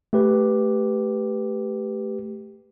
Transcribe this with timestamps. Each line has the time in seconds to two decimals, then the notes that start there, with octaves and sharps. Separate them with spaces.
0.13 A3 G4 B4